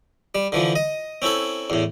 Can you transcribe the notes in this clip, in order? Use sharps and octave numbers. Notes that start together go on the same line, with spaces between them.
G3
D3 E3 F3
D#5
C4 C#4 E4 A4
E2 A2